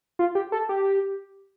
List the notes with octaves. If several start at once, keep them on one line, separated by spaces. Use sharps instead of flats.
F4
G4
A4
G4